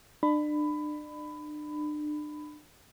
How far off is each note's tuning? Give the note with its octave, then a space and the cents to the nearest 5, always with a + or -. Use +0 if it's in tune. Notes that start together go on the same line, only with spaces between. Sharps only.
D4 +35 B5 +20